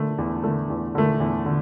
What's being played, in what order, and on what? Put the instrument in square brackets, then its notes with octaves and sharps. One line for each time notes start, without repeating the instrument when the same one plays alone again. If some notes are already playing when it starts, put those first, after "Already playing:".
Already playing: [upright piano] D3 A3
E2
D3 A3
E2
D3 A3
E2
D3